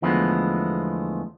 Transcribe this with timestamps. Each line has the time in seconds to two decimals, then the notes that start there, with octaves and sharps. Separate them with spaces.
0.02 E2 D3 F3 G#3 A3 B3